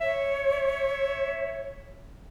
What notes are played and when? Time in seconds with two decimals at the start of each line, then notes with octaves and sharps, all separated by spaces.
0.01 C#5 E5